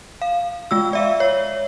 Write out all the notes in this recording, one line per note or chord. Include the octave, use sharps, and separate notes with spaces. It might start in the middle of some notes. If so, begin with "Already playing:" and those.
F5
G#3 F4 E6
D5 E5 F5
C#5